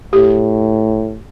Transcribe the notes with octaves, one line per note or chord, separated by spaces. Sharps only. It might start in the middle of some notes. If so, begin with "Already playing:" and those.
A2 G4